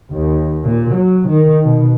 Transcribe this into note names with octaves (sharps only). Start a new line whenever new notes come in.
D#2
A#2
F#3
D#3
B2